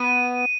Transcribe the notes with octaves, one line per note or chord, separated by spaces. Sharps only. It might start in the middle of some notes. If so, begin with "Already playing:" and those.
Already playing: B3 D#7